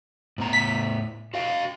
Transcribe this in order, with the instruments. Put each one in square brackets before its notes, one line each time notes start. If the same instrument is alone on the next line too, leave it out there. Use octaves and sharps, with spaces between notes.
[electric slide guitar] A2 B3 A#5
[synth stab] B6
[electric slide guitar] F#4 F5 G5